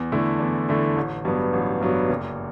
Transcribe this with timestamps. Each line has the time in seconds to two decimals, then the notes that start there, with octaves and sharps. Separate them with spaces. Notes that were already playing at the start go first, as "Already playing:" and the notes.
Already playing: E2
0.12 D3 A3 E4
0.40 E2
0.69 D3 A3 E4
0.96 A1
1.25 G2 F#3 B3
1.53 A1
1.81 G2 F#3 B3
2.09 F#1